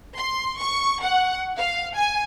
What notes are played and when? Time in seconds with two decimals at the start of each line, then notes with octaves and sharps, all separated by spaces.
0.16 C6
0.58 C#6
1.02 F#5
1.57 F5
1.95 G#5